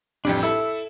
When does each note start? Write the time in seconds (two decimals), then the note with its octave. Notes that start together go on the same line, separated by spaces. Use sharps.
0.25 A1 F2 G3 D4 G4
0.43 E4 A4 E6